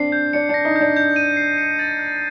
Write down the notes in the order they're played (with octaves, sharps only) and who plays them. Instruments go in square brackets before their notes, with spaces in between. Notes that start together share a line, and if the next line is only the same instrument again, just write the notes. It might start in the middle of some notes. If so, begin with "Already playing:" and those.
Already playing: [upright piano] C4 D4 [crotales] C7
[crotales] G6
[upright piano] D4 [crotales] C#7
[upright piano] D4
[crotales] A#6
[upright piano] D#4
[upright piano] D4 [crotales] G6
[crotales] G6
D#7
C7
C#7
A6
F#6